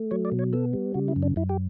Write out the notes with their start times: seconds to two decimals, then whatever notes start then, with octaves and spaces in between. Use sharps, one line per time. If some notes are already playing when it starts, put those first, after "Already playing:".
Already playing: A3
0.11 F#3 C#5
0.25 D5
0.32 B2
0.39 C#5
0.53 B3 A4
0.73 G3
0.94 C#3 F#4
1.08 E4
1.16 F#2
1.23 D4
1.36 F#2 E4
1.49 G4